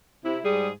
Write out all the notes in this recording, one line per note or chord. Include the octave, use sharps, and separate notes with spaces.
C3 E4
G#2 G3 G#4